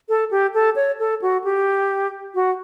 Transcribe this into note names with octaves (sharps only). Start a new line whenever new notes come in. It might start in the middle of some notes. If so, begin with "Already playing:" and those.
A4
G4
A4
C#5
A4
F#4
G4
F#4